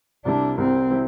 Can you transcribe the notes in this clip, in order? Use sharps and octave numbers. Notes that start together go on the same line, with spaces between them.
C2 C3 G3 D4 E4
C2 C3 G3 C4 E4
C3 G3 E4